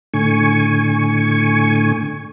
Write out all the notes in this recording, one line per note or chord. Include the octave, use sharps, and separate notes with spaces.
A2 D3 G#5 C#6